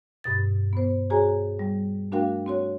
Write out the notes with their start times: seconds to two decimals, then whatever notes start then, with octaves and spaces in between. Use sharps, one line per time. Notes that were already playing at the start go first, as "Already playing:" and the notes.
0.24 G2 B2 A6
0.73 B3 C5
1.10 F#4 G#4 C#5 G#5 A#5
1.59 G3
2.12 A3 D4 F#4 A#4 F5 G5
2.46 C4 F#4 C#5